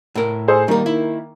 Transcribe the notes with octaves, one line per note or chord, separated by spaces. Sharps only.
A2 A#4
G#4 A4 C5
D#3 G3 A#3 D#4
E4